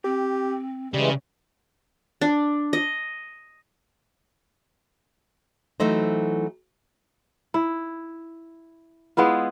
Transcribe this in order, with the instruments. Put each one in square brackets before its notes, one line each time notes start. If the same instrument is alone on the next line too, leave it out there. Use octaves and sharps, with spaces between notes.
[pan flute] C4 [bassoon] G4
[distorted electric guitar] C#3 [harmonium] E3 G#3 [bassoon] G3
[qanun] D4
D#5
[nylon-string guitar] E3 F#3 A3 D#4 C5
[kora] E4
G#3 B3 E4 F4